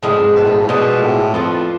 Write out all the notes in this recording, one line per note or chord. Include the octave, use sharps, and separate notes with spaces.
A2 F3 G#3 D4
G#2
F2
G#2
B2
A2
G#2
A2
B2 F3 G#3 D4
A2
F2 F3 B3 D4 F4